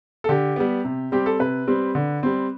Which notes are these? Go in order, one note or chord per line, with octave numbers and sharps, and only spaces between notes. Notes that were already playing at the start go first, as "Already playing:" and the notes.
A4
D3 G4
G3 B3
C3
G3 C4 G4
A4
C3 B4
G3 C4
D3
G3 C4